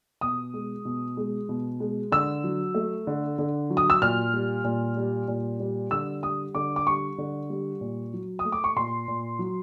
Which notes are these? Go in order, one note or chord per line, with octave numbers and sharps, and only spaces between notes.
B2 D#6
G#3
B2
G#3
B2
G#3
D3 E6
F#3
A3
D3
D3
F#3
D#6
E6
A#2 F6
G3
A#2
G3
A#2
G3
D3 E6
G3 D#6
D3 D6
D6
G3 C#6
D3
G3
A#2
F#3
D#6
A3
D6
C#6
A#2 C6
A#2
F#3